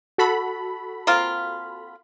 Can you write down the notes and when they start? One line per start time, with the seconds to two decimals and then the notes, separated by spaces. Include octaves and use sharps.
0.18 F#4 A4 B5
1.07 A#3 C4 F4